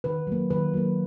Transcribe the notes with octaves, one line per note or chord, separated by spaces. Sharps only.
D#3 B4
F#3 A#3
D#3 B4
F#3 A#3